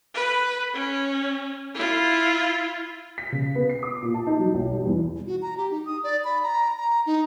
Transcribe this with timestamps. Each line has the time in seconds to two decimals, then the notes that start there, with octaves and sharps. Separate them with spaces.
0.14 B4
0.74 C#4
1.74 E4 F4
3.18 B6
3.32 C#3
3.55 B3
3.69 C7
3.83 D6
4.02 A#2
4.14 A5
4.27 D#4
4.39 F#3
4.54 B1
4.73 G3
4.85 E2
5.27 F#4
5.42 A#5
5.57 G4
5.70 D#4
5.85 D#6
6.04 D5
6.24 B5
6.43 A#5
6.77 A#5
7.06 D#4